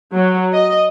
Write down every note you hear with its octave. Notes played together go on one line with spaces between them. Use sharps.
F#3
D#5